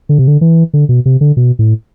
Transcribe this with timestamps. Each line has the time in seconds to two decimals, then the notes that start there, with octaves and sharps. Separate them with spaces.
0.09 D3
0.19 C3
0.28 D3
0.41 E3
0.73 D3
0.89 B2
1.06 C3
1.21 D3
1.37 B2
1.59 A2